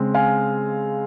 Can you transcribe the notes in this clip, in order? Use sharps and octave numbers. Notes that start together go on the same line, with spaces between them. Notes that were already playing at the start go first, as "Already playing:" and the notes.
Already playing: C#3 G#3 C4
F5 G#5